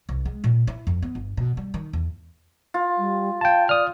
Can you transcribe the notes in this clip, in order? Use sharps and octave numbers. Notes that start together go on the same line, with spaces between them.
C2
G#3
A#2
E4
F2
B3
G1
B2
G3
D#3
E2
F4
G3
F5 G5 A5
D5 D#6 F6